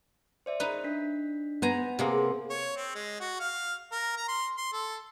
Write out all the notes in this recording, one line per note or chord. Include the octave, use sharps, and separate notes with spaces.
C5 D5 E5
D#4 B4
D4 B6
B3 C5 G#5 A#5
C3 A#3 G#4 C5 F5 C6
C#5
C4
G#3
F#4
F5
A#4
A#5
C6
C6
A4